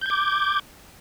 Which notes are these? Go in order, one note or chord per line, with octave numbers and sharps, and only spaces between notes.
D6 G6 G#6